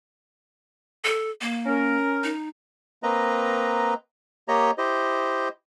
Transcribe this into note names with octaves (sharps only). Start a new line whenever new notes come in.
A4
A#3
C#4 A#4
D#4
A#3 C4 B4 D#5 A#5
A#3 G4 C#5 D#5 A#5
E4 G4 C5 D#5